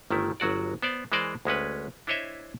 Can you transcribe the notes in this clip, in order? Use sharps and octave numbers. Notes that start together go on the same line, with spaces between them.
G1 D#3 A3 E4
G1 F#3 F#4 D5
B3 C5 D5
E3 G#3 A#4 C5 D5 D#5
D2 G#3 C#4 B4
D4 E4 C5 C#5 D#5 E5